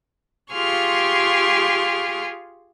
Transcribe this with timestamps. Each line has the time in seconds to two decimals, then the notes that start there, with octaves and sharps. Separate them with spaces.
0.52 F4 G4 G#4 C6 C#6 F6